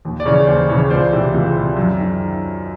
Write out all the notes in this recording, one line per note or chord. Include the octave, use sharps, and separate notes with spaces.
D#2
D5
C#3 E3 C#5
D#2 C5
C#3 E3 C#5
C#2 C5 D5
C3 E3
C#2
C3 E3
F#2
D#3